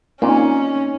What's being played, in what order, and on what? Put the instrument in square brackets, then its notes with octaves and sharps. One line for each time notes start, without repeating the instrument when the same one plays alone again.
[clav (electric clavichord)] A#2 [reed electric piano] A#3 C4 [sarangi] C#4 [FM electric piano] D#4